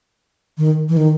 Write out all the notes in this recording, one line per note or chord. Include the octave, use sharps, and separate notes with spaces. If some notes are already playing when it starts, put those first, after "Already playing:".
D#3
E3
D#3